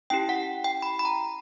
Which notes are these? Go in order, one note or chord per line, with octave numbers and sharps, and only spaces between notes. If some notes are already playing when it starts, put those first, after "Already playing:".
C#4 E4 G4 G5
F#5
G5
B5
B5
A#5